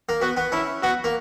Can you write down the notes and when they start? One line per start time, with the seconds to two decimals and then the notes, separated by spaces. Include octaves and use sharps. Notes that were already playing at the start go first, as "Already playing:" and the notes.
0.09 A#3
0.21 B3 F#4
0.37 B3
0.52 C#4 E4
0.83 B3 F#4
1.04 A#3